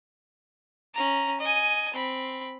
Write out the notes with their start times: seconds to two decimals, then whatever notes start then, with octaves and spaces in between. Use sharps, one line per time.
0.94 C#4 A#5
1.40 D#5 G#5
1.94 C4 B5